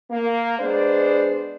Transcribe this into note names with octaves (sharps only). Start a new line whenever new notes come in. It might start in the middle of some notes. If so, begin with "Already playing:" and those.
A#3
G#3 B3 D4 C5 D5